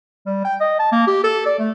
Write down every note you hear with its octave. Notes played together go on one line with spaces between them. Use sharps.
G3
G5
D#5
A5
A#3
G4
A4
D5
A3